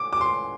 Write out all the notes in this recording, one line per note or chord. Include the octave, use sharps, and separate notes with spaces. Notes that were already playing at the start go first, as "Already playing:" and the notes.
Already playing: D6
D6
C6